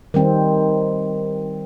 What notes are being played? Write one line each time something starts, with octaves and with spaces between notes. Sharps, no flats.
D#3 G3 C4